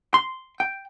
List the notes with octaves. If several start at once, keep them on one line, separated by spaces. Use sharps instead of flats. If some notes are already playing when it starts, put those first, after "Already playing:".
C6
G5